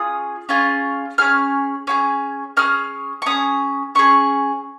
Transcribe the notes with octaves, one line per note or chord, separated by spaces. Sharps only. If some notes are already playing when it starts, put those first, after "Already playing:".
Already playing: C#4 F4 G#4 D#6
C#4 F4 G#4
C#4 F4 G#4 F6
C#4 F4 G#4
C#4 G#4 F6
C#6
C#4 G#4 D#6
C#4 G#4 C#6